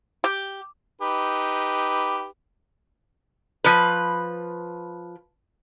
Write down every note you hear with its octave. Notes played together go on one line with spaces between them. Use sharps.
G4
D#4 G4 B4
F3 B4